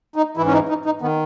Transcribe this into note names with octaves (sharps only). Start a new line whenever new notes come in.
D#4
G#2 E3 E4
C#4
D#4
D#4
D#4
D#3 B3